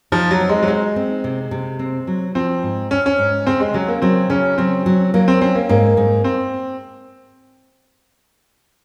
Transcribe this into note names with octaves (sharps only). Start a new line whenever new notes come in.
F3 D#4
F#3
C4
G#3
F#3
G#3 D#4
C4
C3
C3
C4
F#3
F3 C4
G#2
C4 C#4
C#4
G#2
C#3 C4
G#3
C#3 F#3
A#3
F#3 C4
C#3 C#4
F#3 C4
F#3
F#3 A#3
C4
C4 C#4
A#3
G#2 A#3
G#2
C4